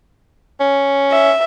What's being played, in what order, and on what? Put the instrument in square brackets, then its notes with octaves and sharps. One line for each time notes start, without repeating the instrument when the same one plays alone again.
[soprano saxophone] C#4
[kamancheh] E5